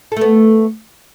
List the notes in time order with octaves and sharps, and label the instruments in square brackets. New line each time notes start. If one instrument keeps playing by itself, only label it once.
[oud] A4
A3
B3